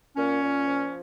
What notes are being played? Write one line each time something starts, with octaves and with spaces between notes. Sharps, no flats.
A#2 C#4
A#2
F3